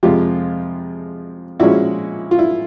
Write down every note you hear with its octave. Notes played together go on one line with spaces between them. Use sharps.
F2 C3 F3 G#3 F4 G4
A#2 F3 G#3 C#4 E4 F#4
F4
E4